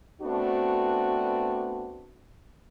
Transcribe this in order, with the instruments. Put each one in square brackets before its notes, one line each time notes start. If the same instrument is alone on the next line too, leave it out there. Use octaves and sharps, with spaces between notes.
[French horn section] A3 B3 C4 D4 F#4